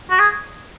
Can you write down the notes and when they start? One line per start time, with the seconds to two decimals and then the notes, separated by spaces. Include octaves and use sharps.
0.10 F#4
0.19 G#4